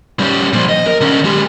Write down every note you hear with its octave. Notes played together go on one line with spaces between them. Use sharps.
G3 C#4
A#2 F3
D#5
A#4
D3 C#4
G#3 G4